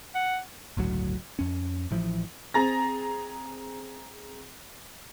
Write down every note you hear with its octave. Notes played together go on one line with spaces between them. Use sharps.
F#5
G1 C#2 A2 F#3
F2 C#4
A1 A2 E3 F3
C4 G#4 A#5 A6 A#6